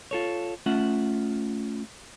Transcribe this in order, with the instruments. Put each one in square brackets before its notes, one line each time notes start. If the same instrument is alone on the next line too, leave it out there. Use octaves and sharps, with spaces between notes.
[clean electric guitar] F4 A4 C#5
A3 C#4 F4 E5 F#5